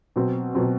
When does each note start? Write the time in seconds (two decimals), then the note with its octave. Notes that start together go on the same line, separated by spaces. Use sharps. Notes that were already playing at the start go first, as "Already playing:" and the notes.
0.16 B2 F#3 C4
0.55 B2 F#3 C4